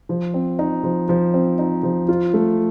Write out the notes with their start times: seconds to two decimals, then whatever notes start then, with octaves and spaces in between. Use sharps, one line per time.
0.09 F3
0.34 C4
0.59 D#4
0.84 F3
1.09 F3
1.34 C4
1.59 D#4
1.83 F3
2.09 F4
2.34 A3